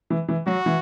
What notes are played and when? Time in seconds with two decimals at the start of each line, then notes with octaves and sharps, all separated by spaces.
0.10 E3
0.28 E3
0.46 F#3 F#4
0.66 E3